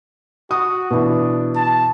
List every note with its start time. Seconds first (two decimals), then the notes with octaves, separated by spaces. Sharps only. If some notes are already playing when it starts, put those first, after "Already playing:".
0.51 F#4 D#6
0.91 B2 E3 D4
1.56 A5